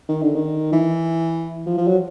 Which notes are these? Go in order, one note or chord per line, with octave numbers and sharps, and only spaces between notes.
D#3
D3
D#3
E3
F3
F3
F#3